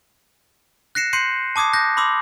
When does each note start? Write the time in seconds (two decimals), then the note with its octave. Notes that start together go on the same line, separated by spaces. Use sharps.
0.95 F#6 A#6 C7 C#7 E7
1.13 C6 G6 C7 C#7 D#7
1.56 A5 D6 D#6 G#6 C7
1.73 F#6 G6 A#6
1.97 B5 C6 D6 E6